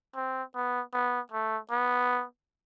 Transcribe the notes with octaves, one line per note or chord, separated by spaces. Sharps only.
C4
B3
B3
A3
B3